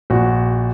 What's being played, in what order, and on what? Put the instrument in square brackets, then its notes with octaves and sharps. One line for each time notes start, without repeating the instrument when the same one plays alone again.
[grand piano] A#1 F#4